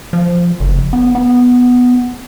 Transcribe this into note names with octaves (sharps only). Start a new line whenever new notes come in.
F3
F#1
B3
B3